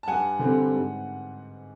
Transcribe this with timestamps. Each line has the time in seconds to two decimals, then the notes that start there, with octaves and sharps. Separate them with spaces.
0.03 A5
0.08 G2 F#5 G#5
0.39 D3 G3 C4
0.71 G#2